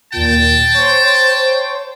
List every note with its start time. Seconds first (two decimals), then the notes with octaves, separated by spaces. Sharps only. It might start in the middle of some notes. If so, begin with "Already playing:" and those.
0.13 D#2 A#2 G5 A5
0.74 C5 C#5